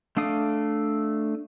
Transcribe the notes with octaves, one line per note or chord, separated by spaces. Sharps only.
A3 D4 F5 D#6